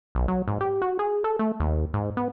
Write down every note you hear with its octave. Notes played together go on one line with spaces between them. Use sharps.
B1
F#3
G#2
G4
F#4
G#4
A4
A3
D#2
G#2
B3